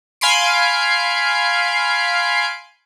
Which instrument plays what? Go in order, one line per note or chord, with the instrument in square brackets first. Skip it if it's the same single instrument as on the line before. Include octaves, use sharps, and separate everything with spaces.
[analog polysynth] F5 G#5 B5 C6 C7 D7